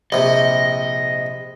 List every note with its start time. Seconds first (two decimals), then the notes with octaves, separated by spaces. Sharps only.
0.12 A#1 C3 D#5